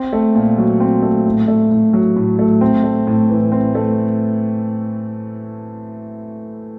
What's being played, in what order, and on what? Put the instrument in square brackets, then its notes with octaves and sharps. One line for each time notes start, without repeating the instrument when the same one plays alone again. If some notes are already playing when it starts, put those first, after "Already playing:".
Already playing: [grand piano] C4
A3
A#2
F#3
C4
A3
A2
A3
A2
F#3
A2
A3
C4
A3
A2
E3
C4
A3